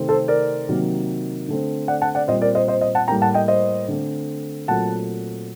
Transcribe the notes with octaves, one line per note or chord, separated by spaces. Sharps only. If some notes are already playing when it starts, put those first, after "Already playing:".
Already playing: C3 D#3 A3 C4
A4 C5
A#4 D5
C3 D#3 F#3 A#3
D3 A3 C4
D5 F#5
F#5 A5
D5 F#5
A#2 G3 C4 C5 D#5
A#4 D5
C5 D#5
C5 D#5
C5 D#5
F#5 A5
A2 G3 A#3 G5 A#5
F#5 A5
D#5 G5
C5 D#5
D3 A3 C4
A#2 F#3 A3 C4 F#5 A5